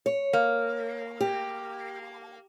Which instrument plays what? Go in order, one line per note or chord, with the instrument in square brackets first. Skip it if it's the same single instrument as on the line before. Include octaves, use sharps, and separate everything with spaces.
[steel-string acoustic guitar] C#5
[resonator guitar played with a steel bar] A#3
[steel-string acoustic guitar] G4